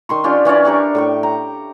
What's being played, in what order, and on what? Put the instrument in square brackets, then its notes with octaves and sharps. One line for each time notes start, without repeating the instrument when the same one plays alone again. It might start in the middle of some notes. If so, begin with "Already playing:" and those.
[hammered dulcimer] D#3 C6 C#6
C#4 D4 F4 G4
E3 C#4 C#5 D5
D4 G4 A#4 C#6
A2 G5 C#6
A#5